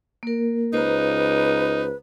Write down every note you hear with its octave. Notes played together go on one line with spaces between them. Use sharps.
A#3 A#4
C#2 D#4 B4 C5 A#5